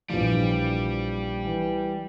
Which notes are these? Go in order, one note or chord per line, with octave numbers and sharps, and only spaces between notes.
A#1 E3 F3 G3
E3